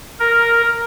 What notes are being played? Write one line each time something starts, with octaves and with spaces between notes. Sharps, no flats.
A#4